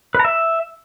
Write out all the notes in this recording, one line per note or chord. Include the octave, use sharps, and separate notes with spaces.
B4
A#5
E5